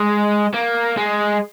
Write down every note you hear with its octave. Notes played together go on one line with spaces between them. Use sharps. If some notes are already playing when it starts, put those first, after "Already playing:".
Already playing: G#3
A#3
G#3